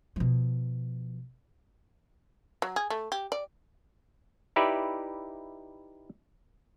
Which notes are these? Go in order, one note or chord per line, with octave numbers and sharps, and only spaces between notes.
B2 F3
F#3
G#4
A3
G4
D5
D#4 E4 G4 B4 D5 E5